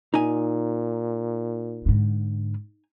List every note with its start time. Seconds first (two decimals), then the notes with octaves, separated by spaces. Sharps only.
0.14 A#2 D#4 G#5
1.86 G#2 D3